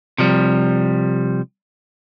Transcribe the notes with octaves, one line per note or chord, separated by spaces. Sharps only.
C3 F3 G3